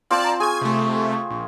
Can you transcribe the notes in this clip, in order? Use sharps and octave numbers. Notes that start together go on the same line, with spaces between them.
C4 F4 C5 D5 A5
A#5
G#4 G#5 C#6 G#6
C3 A3
A#1